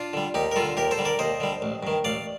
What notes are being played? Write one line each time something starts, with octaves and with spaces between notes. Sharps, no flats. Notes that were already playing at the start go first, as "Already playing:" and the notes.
Already playing: D4 F4
D3 G3
D#2 D#4 G4
A#4
D3 G3 F4 A4
D#2 G4 A#4
A4 C5
D3 G3
A#4 D5
D#2 C5 D#5
D3 G3
A1
G2 D#3
A1 D5 F5